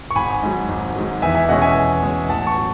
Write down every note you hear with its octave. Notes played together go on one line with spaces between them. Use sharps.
C#6
G#1 G#5 B5
G#2 F#3
G#1
G#2 F#3
E2 E5 G#5
E5 G#5
B2 G#3 C#4 D#5 F#5
E5 G#5
E2
B2 G#3 C#4
A1 F#5 A5
A5 C#6
F#3